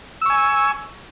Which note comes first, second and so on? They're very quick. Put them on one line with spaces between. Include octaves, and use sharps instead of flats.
E6 C#6 G#5